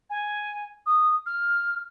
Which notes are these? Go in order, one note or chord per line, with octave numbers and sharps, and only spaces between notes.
G#5
D#6
F6